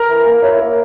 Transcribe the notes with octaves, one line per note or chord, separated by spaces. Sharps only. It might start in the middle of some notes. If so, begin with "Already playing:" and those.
Already playing: A#4
E3
A#3
E4 C#5
A#3 A#4